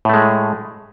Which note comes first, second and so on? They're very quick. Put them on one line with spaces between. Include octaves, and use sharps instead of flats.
A2 A3 G#3